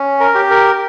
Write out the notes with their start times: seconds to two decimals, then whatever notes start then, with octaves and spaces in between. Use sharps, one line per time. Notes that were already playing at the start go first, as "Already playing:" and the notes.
Already playing: C#4
0.20 A#4
0.35 G4
0.51 A#4